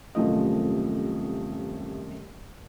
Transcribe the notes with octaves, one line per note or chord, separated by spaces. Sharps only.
D#1 F#2 C3 F3 A3 D#5